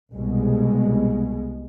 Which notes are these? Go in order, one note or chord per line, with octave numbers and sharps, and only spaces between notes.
C2 B2 G#3